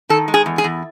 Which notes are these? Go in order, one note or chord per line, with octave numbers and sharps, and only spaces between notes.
D#3 A4
G#3
G#4
E2
G#4
E2